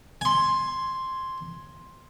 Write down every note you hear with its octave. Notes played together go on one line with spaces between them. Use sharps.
G#5 C6